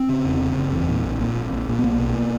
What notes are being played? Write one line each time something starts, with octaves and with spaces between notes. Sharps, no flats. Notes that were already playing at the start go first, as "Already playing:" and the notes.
Already playing: C4
C#3
E2
C#3
F#1
E2
A#2
A#1
A#2
A#1
A#1
A#2
B3
B1 A#3
B2